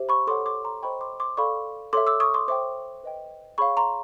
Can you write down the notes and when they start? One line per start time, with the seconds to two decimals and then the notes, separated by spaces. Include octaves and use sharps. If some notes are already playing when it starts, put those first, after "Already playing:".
Already playing: G4 C5 E5
0.09 B5 C#6
0.27 A4 C#5 F#5 C6 D6
0.46 C6 D6
0.65 A#5 C6
0.83 C5 D#5 G5 B5 C#6
1.01 C6 D6
1.20 C6 D6
1.37 A4 D5 F5 B5 C#6
1.93 A4 C#5 E5 C6 D6
2.07 D6 E6
2.20 C#6 D#6
2.34 C6 D6
2.48 C5 E5 G5 C6 D6
3.04 B4 D#5 G5
3.58 G#4 C#5 F5 B5 C#6
3.77 A#5 C6